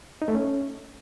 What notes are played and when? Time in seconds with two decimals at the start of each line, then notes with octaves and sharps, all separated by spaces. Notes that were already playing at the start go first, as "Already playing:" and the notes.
0.22 D#4
0.28 A3
0.35 C#4